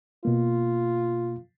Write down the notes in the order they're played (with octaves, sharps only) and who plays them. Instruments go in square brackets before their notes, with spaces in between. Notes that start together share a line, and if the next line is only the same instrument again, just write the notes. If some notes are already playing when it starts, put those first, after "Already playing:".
[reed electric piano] B2 A#3 [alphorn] F4